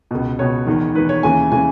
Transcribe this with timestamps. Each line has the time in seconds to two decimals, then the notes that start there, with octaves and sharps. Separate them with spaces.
0.11 C#2 B2
0.39 C#2 B2 C#5
0.67 E2 D#3
0.95 E2 D#3 B4
1.09 C#5
1.23 D#2 C#3 E3 G#5
1.52 C#3 E3 G#5